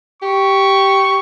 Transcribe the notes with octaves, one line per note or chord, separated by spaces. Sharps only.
G4 C#6